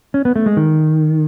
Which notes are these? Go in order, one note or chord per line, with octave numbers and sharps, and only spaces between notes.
C#4
B3
A3
G#3
D#3